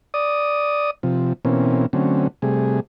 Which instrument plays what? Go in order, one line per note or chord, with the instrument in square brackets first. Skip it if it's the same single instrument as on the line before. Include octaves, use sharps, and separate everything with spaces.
[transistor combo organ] D5 D#6
C3 F3
B2 E3 A#3 C4 C#4
D3 F#3 A3 C4 C#4
C3 G3 A3 G#4